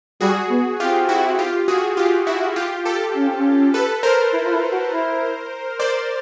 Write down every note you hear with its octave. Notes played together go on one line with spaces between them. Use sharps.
G3 F#4 G#4
B3
C4 F4 G4
E4 F#4
F4 G4
F#4 G#4
F4 G4
E4 F#4
F4 G4
G4 A4
C#4
C4
C#4
A4 B4
A#4 C5
E4
F4
E4
F#4
E4
C5 D5